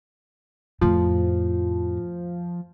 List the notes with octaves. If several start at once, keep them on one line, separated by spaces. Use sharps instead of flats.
F2 A2 F3